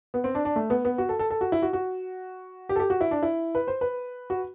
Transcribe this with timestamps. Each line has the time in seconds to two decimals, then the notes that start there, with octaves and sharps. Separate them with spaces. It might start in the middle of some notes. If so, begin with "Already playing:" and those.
0.14 B3
0.24 C4
0.35 D4
0.45 D4
0.56 A3
0.70 B3
0.85 B3
0.98 F#4
1.09 A4
1.19 A4
1.30 A4
1.41 F#4
1.52 E4
1.62 F#4
1.73 F#4
2.69 G4
2.76 A4
2.79 G4
2.90 F#4
3.01 E4
3.11 D4
3.23 E4
3.55 B4
3.67 C5
3.81 B4
4.30 F#4